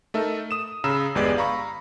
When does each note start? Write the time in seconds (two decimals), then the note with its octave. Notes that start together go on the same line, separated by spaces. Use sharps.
0.14 A3 D#4 A4 A#4 E5
0.51 D#6 E7
0.84 C#3 A#5 B5 E6 E7
1.15 G1 E2 G#3 G4 B4 D5
1.37 F5 A#5 B5 C#6